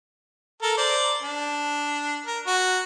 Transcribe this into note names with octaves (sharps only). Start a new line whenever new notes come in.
A4 A#4
C5 D5
D4
A#4
F#4